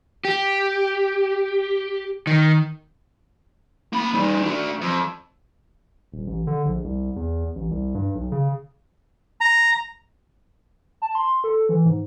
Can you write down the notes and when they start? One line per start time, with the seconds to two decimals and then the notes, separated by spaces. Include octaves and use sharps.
0.25 G4
2.27 D#3
3.93 A#3 B5
4.14 G3 D#4
4.42 D4 F#4
4.81 F2
6.12 D#1
6.27 A1
6.47 D3
6.65 A#1
6.84 C2
7.16 E2
7.55 A1
7.71 C2
7.95 G2
8.15 B1
8.32 C#3
9.41 A#5
11.02 A5
11.15 C6
11.44 A4
11.69 E3
11.85 G#2